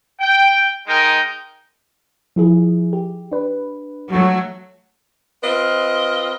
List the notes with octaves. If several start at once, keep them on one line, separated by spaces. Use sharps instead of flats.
G5
G#3 D#4 A#4 G5
F3 E4 G#4
G4
D4 B4
F#3 A3
C4 F4 B4 D#5